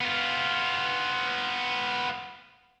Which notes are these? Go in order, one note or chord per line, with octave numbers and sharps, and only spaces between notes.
B3 F4